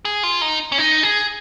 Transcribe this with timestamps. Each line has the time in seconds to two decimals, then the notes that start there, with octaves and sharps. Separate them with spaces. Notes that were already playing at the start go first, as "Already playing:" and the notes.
0.05 G#4
0.23 F4
0.41 D#4
0.72 C#4
0.78 D#4
1.03 G#4